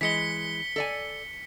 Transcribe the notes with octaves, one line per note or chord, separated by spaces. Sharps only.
E3 G#3 B6 C#7 G7
A4 D5 G#5